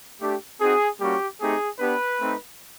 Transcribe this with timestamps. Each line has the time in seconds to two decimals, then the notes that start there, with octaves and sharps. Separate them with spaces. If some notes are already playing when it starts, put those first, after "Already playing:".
0.21 A3 D4 G4
0.60 C4 D#4 F#4 G#4
1.00 G3 A#3 C#4 F#4 G4
1.41 A3 C4 D#4 G4 G#4
1.80 B3 D4 G4 B4
2.20 A3 C4 D#4